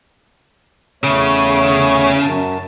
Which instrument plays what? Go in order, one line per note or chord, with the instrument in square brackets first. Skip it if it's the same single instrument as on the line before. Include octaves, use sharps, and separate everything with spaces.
[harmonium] E2 A3 C#5 [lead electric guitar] C#3
[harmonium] F#2 A5